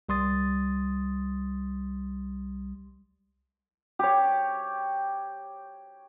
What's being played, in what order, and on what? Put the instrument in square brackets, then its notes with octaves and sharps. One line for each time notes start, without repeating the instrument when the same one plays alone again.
[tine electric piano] C2 G3 C6 D#6 A6
[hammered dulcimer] G4 C#5